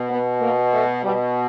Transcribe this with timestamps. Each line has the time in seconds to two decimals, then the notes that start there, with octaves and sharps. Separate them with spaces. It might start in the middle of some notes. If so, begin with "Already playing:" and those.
Already playing: B2
0.09 B3
0.41 A#3
0.73 A3
1.03 B2 G3